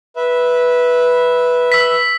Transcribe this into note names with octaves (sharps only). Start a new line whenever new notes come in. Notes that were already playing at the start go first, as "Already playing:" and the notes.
B4 E5
E6 B6